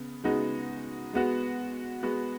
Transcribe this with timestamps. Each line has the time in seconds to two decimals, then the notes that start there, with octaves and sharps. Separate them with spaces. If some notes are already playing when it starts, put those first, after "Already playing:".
Already playing: C#3 B3
0.23 C#3 G#3 B3 D#4 F#4
1.13 G#3 B3 F#4
2.03 G#3 B3 F#4